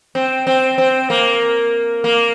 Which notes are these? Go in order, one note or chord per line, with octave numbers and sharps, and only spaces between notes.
C4
C4
C4
A#3
A#3